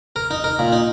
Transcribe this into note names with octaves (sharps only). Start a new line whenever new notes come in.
A#4
D#4
A#4
A#2
D#4